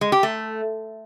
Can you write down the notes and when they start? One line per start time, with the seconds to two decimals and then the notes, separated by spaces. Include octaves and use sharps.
0.01 G#3
0.12 G4
0.23 A3